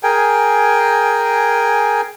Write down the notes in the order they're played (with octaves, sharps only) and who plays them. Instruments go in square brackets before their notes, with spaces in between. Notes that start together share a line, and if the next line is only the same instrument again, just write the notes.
[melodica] G#4 A#4 G5 G#5